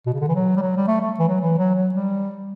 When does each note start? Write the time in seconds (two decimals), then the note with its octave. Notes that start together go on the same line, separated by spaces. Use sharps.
0.06 B2
0.14 C#3
0.20 D3
0.28 E3
0.35 F#3
0.56 G3
0.62 F#3
0.76 G3
0.88 A3
1.01 A3
1.19 E3
1.28 F#3
1.41 E3
1.58 F#3
1.75 F#3
1.94 G3